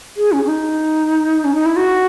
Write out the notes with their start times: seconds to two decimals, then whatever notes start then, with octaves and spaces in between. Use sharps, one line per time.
0.17 G#4
0.32 C#4
0.44 C#4
0.48 D#4
1.45 C#4
1.55 D#4
1.66 E4
1.76 F#4